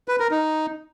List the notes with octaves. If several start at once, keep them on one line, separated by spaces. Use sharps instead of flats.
B4
A#4
D#4